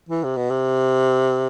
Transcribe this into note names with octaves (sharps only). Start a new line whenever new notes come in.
E3
C3
B2
C3